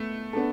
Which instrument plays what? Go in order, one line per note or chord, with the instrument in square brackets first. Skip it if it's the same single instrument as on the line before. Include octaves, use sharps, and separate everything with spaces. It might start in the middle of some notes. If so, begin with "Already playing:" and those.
Already playing: [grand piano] A3 [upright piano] B3
[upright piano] B3 D4 A4